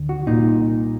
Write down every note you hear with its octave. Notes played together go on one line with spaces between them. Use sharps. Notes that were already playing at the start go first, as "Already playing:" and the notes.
Already playing: D2 D3
F#4
C2 A#2 D#4